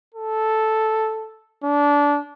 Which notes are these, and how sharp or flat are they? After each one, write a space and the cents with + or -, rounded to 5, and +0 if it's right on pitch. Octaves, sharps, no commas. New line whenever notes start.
A4 -5
D4 -20